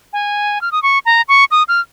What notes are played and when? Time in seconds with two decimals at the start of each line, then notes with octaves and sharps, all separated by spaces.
0.13 G#5
0.61 F6
0.72 D#6
0.83 C#6
1.06 A#5
1.28 C#6
1.51 D#6
1.68 F6